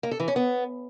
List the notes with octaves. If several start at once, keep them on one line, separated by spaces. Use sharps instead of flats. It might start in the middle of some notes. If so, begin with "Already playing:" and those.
A#3
A4
E3
C#4
B3